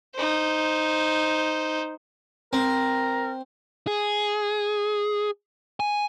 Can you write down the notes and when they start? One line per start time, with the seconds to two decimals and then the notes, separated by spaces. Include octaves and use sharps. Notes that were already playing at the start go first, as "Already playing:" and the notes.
0.15 D#4 C5
2.53 C4 A#4
3.87 G#4
5.80 G#5